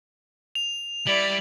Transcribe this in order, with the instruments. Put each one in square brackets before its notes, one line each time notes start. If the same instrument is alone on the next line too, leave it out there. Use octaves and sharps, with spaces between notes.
[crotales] F7
[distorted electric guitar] G3 [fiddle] E4 D5 [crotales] F#7